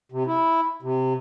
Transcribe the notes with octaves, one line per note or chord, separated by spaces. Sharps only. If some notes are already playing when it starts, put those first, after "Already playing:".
C3
E4
C3